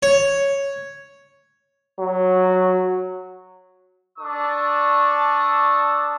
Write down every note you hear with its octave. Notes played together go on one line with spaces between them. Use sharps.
C#5
F#3
D4 A4 D5 A5 C#6 D#6